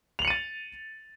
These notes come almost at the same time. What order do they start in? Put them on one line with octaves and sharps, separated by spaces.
F7 F#7 C#7 D#7 A6